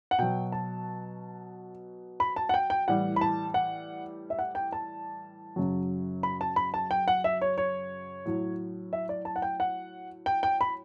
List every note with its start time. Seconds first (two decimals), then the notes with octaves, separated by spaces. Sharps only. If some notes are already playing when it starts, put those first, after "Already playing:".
0.11 F#5
0.19 B2 F#3 G5
0.52 A5
2.20 B5
2.36 A5
2.49 F#5
2.54 G5
2.70 G5
2.88 A2 E3 G3 F#5
3.16 B5
3.21 A5
3.54 F#5
4.30 E5
4.39 F#5
4.55 G5
4.73 A5
5.56 F#2 C#3 F#3
6.23 B5
6.41 A5
6.56 B5
6.74 A5
6.91 G5
7.08 F#5
7.24 E5
7.41 C#5
7.58 C#5
8.25 A2 F#3
8.93 E5
9.09 D5
9.25 A5
9.36 F#5
9.42 G5
9.60 F#5
10.26 G5
10.43 G5
10.61 B5